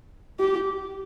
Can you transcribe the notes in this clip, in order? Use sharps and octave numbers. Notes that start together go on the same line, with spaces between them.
G4